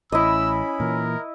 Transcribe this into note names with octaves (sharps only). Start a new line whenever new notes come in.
A1 C#4 E4 D#5 B5 E6
A#2 E3 A#4